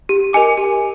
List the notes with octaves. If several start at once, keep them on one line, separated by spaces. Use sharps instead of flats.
G4
A#4 D#5 G#5 D6
G4